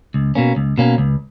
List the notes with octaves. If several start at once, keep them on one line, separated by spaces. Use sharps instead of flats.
C#2
B2 A#3 C#4
C#2
B2 A#3 C#4
C#2